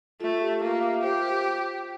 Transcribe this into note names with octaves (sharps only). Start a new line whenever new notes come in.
A3 F4
G4
A#3 F4
E5
G4 C5